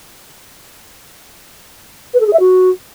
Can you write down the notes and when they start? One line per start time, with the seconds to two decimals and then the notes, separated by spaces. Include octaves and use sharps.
2.13 B4
2.20 A4
2.26 G#4
2.33 E5
2.39 F#4